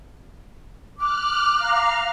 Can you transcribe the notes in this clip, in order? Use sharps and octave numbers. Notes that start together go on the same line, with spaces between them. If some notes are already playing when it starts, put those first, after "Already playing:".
D6 F6 F#6
F5 A#5 F6